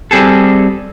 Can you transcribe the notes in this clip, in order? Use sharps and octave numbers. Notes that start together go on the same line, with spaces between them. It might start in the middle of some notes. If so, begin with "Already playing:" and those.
G3 C4 G#4 A4